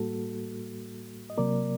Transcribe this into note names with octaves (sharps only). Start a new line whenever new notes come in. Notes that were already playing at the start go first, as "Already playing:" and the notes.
Already playing: A2 G3 A#3 F#4 A4
D#5
C3 F#3 A#3 A#4 D5